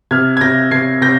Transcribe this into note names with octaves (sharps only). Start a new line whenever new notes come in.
C3 F6 G#6
G#6
C3 G6 A#6
C3 G#6 C7
C3 G6 A#6